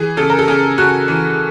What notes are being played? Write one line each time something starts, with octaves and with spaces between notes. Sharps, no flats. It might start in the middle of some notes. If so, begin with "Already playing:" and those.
Already playing: E3 G#4
C#3 A4
A#4
A4
C#3 G#4
C#3 F#4
E3